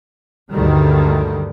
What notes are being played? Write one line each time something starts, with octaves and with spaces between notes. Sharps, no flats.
D2 G2 D3 D#3 G3